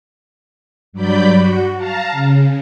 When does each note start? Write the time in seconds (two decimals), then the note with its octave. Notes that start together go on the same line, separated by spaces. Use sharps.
0.93 G2 F#3 D5 B5 G6
1.34 F#4
1.77 F5 A5 A#5
2.12 C#3